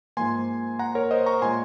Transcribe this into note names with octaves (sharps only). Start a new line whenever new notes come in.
G#2 F3 A#3 G#5 C6
F#5 A#5
A#4 C#5
C5 D#5
A#5 C#6
A#2 G#3 G#5 C6